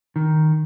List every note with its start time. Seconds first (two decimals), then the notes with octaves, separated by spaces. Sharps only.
0.16 D#3